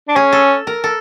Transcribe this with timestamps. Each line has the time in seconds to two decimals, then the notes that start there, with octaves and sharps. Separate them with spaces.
0.08 D4
0.16 C#4 G#4
0.33 A4
0.67 A#4
0.84 A4